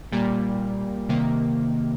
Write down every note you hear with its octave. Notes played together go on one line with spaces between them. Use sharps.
A#2 G3 A#3
C3 D#3 A#3